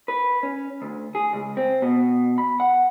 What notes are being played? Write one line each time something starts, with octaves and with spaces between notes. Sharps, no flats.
B4
C#4
D2
G#4
C#2
C4
B2
B5
F#5